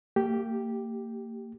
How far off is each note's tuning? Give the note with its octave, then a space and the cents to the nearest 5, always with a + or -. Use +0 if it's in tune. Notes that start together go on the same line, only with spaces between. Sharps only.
A#3 -35 G4 +0